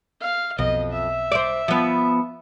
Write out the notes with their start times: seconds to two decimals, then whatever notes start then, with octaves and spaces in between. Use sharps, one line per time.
0.21 F5
0.59 B1 F2 D#5
0.92 E5
1.32 C5 D5
1.68 F3 B3